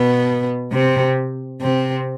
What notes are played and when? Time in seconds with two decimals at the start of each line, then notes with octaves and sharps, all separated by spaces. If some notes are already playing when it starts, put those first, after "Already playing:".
Already playing: B2 B3
0.72 C3 C4
1.61 C3 C4